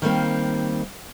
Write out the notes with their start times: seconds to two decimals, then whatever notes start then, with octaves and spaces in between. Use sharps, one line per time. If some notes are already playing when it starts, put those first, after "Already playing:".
0.02 D#3 G3 A#3 C4